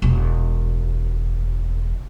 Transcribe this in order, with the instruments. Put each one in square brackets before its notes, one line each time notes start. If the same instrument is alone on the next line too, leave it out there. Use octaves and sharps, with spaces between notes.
[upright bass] E1 B2